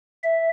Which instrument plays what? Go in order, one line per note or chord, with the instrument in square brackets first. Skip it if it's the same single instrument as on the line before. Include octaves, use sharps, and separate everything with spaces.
[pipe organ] E5